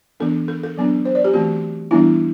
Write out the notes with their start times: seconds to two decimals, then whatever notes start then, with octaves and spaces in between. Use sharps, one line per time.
0.20 E3 B3 D4 A4
0.48 A4
0.63 A4
0.77 F#3 B3 D4
1.05 C5
1.15 D5
1.25 G4
1.34 E3 A3 C4 F#4
1.91 E3 G3 B3 D4 E4